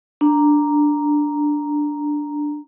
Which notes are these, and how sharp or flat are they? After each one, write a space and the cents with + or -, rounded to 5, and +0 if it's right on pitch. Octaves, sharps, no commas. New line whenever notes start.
D4 +0 A#5 +0